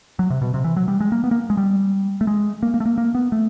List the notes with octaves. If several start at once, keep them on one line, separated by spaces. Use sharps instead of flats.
F#3
C3
B2
C3
E3
F#3
G3
G#3
A#3
B3
A#3
G#3
G3
A3
G#3
A#3
A#3
A3
A#3
A#3
B3
A3